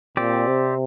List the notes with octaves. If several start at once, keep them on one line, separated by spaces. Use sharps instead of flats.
A#2 C4 G4 D5
C3